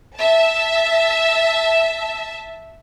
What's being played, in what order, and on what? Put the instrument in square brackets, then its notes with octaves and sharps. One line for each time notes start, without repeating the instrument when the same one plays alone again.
[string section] E5 A5